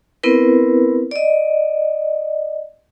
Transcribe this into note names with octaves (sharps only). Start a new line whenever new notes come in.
B3 C4 E4 A#4 B4
D5 D#5